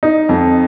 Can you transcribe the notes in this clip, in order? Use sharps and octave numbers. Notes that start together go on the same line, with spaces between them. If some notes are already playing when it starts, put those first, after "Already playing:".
D#4
F2